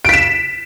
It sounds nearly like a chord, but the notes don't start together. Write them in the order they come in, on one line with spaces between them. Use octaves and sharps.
D7 B6 E7